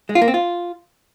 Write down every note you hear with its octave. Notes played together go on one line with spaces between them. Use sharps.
G#3
F4
A#3
C4
F4